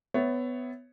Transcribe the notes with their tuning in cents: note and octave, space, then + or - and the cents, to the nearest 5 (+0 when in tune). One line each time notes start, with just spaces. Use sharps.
B3 +20 C#5 +0 E5 +0